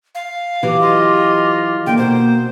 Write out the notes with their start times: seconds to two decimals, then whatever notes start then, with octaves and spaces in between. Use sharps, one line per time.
0.15 F5
0.63 E3 F#3 G4
0.81 F4 D#5
1.86 D3 A#3 G5
1.98 B2 C5